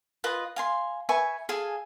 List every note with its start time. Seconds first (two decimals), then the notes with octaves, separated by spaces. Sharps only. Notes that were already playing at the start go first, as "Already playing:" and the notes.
0.24 F4 B4 D#5
0.56 F5 G#5 C6
1.09 B4 E5 G#5 C#6
1.49 G#4 A4 F5 G#5